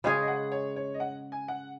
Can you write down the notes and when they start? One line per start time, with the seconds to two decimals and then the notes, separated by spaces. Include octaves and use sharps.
0.04 C#3 G#3 C#4 G#4
0.22 D#5
0.28 F#5
0.52 C#5
0.76 C#5
0.94 D#5
1.00 F#5
1.32 G#5
1.48 F#5